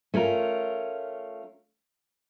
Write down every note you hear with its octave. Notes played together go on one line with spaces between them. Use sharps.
A3 C#4 F4 A#4